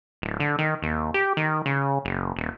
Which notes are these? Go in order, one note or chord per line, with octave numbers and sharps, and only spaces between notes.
D1
D3
D#3
D#2
G4
D#3
C#3
F#1
D#1